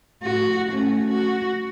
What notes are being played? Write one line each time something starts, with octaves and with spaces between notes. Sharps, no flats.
A2 F#4
A3 C#4
F#4